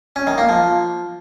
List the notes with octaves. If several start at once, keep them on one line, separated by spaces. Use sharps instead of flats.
C#4
D#3
A#3
F3